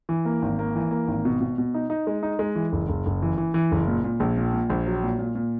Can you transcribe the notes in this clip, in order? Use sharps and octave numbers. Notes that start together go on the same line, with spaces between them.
E3
A#3
G#1
A#3
E3
A#3
G#1
B2
B2
B2
D#4
D#4
G#3
D#4
G#3
E3
F#1
F#1
F#1
E3
E3
E3
F#1
A#2
A#2
A#1
A#2
A#2
A#1
F#3
A#2
A#2
A#2